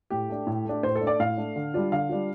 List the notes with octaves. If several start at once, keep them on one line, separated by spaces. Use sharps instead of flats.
A2 G4
A3 D4
A2
A3 D4
A2 C5
A4
A3 D4
D5
A2 F5
A3 D4
D3
G3 D4 F4
D3 F5
G3 D4 F4